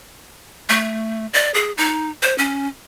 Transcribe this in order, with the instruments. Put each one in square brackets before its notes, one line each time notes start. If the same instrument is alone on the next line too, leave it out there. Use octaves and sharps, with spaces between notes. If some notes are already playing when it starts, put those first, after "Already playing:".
[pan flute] A3
D5
G#4
D#4
C5
C#4